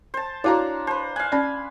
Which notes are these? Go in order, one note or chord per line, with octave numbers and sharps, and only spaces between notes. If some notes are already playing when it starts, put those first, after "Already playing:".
C5 A5
D4 E4 F#4 C#5 F5 A#5
B4 C5 A5
F5 G#5 F#6
C#4 D5 B5